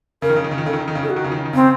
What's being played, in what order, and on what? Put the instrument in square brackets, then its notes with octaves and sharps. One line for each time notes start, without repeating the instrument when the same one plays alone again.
[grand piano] C#3 [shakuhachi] A#4
[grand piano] D#3
C#3
D#3
C#3
D#3
[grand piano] C#3 [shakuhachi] A4
[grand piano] D#3
C#3
D#3
C#3
[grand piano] D#3 [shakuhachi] A4
[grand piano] C#3 [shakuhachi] F#4
[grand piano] D#3
C#3
D#3
C#3
D#3
[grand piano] C#3 [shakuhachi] C4